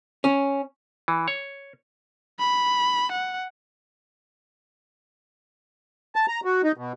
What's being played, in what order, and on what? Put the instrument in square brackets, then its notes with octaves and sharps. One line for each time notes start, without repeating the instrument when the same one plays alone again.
[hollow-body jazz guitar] C#4
[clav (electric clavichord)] E3
C#5
[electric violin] B5
F#5
[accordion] A5
A#5
F#4
D#4
B2